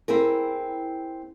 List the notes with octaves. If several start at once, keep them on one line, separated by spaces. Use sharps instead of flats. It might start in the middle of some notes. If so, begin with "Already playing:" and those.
C4 E4 G#4 A#4